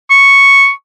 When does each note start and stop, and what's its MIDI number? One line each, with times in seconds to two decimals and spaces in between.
0.10 0.70 85